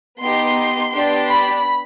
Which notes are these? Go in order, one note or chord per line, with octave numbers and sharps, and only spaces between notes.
B3 D#4 G4 C6
B3 D4 G4
B5